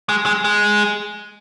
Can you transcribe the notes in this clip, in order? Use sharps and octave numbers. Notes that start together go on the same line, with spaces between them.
G#3
G#3
G#3